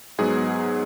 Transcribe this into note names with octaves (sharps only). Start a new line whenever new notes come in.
G#2 F#3 B3 G#4